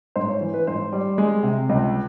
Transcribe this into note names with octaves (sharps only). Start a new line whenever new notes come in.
G#2 C5
C#5
E3
B4
G#2 C5
G3
G#3
C3
C#2